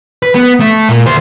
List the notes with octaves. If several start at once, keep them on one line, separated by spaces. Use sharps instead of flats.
B4
B3
A3
A#2
D2 C5